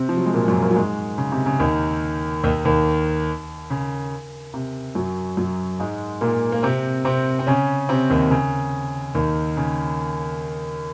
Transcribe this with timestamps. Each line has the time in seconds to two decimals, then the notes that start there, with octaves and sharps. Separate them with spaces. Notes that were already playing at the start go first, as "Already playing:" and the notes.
Already playing: C3 C4
0.09 F3
0.17 F#3
0.26 G#3
0.34 A#2 A#3
0.48 F#2 F#3
0.62 A#2 A#3
0.71 F#3
0.76 G#2 G#3
1.18 C#3
1.32 C3
1.46 C#3
1.60 D#2 D#3
2.44 D#2 D#3
2.65 D#2 D#3
3.70 C#3
4.54 C3
4.95 F#2 F#3
5.37 F#2 F#3
5.80 G#2 G#3
6.21 A#2 A#3
6.52 A#3
6.63 C3 C4
7.05 C3 C4
7.39 C4
7.47 C#3 C#4
7.89 C3 C4
8.10 D#2 D#3
8.31 C#3
9.15 D#2 D#3
9.57 C#3